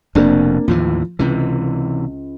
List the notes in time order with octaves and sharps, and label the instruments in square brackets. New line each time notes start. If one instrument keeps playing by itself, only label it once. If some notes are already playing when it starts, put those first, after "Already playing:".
[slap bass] F1 F2 B2 [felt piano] A#3 C4 D4
[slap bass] D#2 A2 E3 [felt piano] F3
[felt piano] C#2 [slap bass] C3 E3